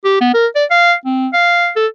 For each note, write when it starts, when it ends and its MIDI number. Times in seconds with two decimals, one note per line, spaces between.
0.04 0.19 67
0.21 0.30 59
0.34 0.47 70
0.55 0.65 74
0.71 0.94 77
1.05 1.27 60
1.33 1.70 77
1.76 1.87 69